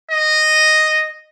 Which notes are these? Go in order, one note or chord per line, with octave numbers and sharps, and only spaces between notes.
D#5